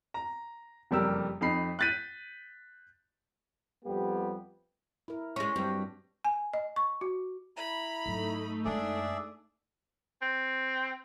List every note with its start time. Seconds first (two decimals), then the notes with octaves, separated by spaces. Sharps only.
0.14 A#5
0.91 F#1 F2 G3 G4 A#4 E6
1.41 F2 D#4 B5 C7
1.79 F#6 G6 A6 B6 D#7
3.85 F2 G3 B3 G4
5.08 E4 A#4
5.36 G#3 C#4 C#6 A#6
5.56 G2 F#3 C4 G4
6.25 G#5
6.54 D#5
6.76 C#6
7.01 F#4
7.57 E4 A#5 B5
8.06 G#2 F#3 A3 D#4
8.65 F#2 G#3 D4 G#4 D5 E5
10.22 C4